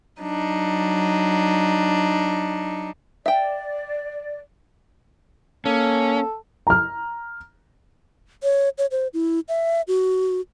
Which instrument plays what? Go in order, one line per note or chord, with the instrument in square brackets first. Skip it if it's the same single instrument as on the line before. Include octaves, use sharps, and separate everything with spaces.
[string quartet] F#3 D4 D#4
[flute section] D5 [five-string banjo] E5 G5
[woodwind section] A#3 [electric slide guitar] C#4 [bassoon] A4
[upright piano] A#5 F6
[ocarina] C#5
C#5
C5
E4
E5
F#4